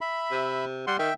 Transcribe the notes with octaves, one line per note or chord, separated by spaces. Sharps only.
E5 B5
C3
G3 F#5 C6
D#3 E5 G5